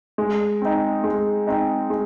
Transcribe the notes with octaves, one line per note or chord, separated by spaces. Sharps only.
G#3
C4 D#4
G#3
C4 D#4
G#3